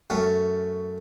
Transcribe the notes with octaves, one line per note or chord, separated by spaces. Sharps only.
F#2 A3 C#4